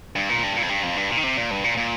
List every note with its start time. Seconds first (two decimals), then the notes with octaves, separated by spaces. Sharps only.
0.16 G2
0.29 A#2
0.43 G2
0.57 A#2
0.63 F2
0.69 G2
0.83 F2
0.97 G2
1.10 A#2
1.17 D#3
1.24 C3
1.37 A#2
1.51 G2
1.64 A#2
1.77 A#2